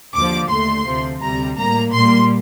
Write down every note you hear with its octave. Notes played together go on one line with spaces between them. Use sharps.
D#2 D3 F3 D6
D#2 D3 A3 C6
D2 C3 F3
D2 C3 G3 A#5
A2 G3 A#3 A#5
A#2 G3 A#3 C6